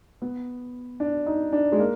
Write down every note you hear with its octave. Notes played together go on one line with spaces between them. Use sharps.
B3
D4
D#4
D4
G#3
A#3